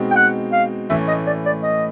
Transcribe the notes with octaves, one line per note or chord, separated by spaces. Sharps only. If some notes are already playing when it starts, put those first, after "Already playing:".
Already playing: B2 G#3 C4 D#4
G5
F#5
F5
A2 E3 A3 C#4 E5
D#5
D5
D5
D#5